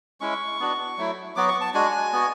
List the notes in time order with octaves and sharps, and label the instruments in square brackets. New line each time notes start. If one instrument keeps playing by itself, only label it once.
[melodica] G#3 C#4 E4 C#6
B3 D4 F#4
F#3 A3 E4
F#3 B3 F#4 D6
C#6
A5
G#3 D4 F#4 G#5
B3 F#4